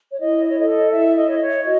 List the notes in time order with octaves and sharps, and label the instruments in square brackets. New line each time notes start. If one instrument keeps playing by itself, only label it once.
[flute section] C#5
E4 D#5
D#5
C#5
A4 D#5
D#5
E4 E5
D#5
C#5 D#5
C#5
F#4 D#5